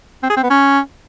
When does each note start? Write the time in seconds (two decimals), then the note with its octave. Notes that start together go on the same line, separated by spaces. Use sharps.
0.23 C4
0.30 G#4
0.36 C4
0.43 B3
0.50 C#4